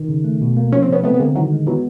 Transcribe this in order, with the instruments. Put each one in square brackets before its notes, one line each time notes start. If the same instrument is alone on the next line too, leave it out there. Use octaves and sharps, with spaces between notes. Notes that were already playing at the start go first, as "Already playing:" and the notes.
Already playing: [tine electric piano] D#3
C#3
A3
B2
A#3
[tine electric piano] F3 [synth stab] C#4
[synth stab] C4
[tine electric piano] C3 [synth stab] B3 C#4
[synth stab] A3 B3 [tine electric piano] C4
[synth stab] B3
[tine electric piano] D3 [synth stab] G#3 A#3
[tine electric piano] D#3 [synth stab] E3 F#3
[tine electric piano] G#3
[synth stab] E3 F#3 [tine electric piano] B3